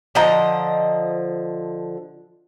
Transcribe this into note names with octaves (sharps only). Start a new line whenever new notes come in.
D3 F3 D#5 A#5